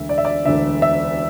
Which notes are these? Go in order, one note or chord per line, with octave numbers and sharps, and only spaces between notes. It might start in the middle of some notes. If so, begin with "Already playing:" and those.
Already playing: E1 D2 D3 E5
D5
E5
D5
E1 D2 D3 E5
E5